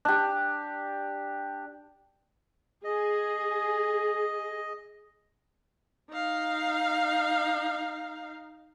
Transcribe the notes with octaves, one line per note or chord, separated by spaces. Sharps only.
D4 G4
G#4 D#5
D#4 F5